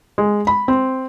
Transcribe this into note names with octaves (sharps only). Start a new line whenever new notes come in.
G#3
B5
C4